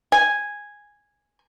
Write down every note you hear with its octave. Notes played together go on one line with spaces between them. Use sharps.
G#5